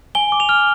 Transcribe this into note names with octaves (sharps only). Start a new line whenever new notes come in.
G#5 G7
D6
F7
F6